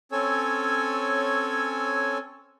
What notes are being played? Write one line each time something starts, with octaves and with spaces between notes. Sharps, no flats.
C4 C#4 A4 C#5 G#5 E6